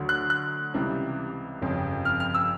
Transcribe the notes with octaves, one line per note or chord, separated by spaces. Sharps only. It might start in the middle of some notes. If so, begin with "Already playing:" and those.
Already playing: D2 D3 F#3
F#6
F#6
C#2 C3 E3 G3
G1 F2 C#3
F6
F6
E6